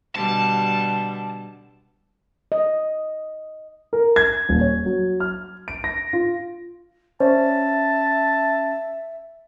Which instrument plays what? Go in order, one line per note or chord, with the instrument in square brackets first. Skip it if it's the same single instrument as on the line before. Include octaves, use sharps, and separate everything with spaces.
[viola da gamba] B2 D3 G3 [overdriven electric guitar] A5
[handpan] D#5
[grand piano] A#4
G#6
D#1
C#5
F#3
F6
D7
A#6
F4
[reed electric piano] C#4 [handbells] C5 D5 [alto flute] E5 [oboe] A5